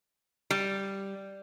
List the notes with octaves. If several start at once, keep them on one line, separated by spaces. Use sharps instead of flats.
G3